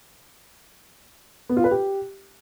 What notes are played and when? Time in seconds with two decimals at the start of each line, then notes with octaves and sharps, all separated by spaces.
1.49 B3
1.57 F4
1.64 B4
1.71 G4